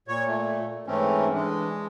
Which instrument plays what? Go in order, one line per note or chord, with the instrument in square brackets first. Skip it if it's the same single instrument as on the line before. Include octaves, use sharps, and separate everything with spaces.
[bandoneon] A#2 [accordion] C#5
[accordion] A3
[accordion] G#2 E3 A3 [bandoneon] C4 C#4
[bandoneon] E3 D4 [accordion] G#3